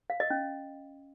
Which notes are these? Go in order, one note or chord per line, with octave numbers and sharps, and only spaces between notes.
F5
D#5
C#4